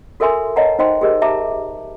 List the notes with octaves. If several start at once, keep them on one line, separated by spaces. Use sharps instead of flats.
F#4 A4 A#4 E5 G#5 C6
B4 C#5 D#5 F#5 A5 A#5
D#4 C5 D#5 G5 C6
G4 G#4 A#4 D#5
E5 A5 A#5 D6